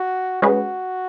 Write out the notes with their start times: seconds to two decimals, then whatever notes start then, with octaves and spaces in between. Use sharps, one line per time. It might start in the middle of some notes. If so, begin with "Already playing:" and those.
Already playing: F#4
0.42 G#3 C#4 F#4 G#4 B4